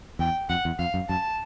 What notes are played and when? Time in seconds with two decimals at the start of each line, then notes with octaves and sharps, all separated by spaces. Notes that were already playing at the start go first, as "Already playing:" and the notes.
0.19 E2 G5
0.49 F2 F#5
0.65 E2
0.79 F2 F5
0.94 F#2
1.09 F#2 A5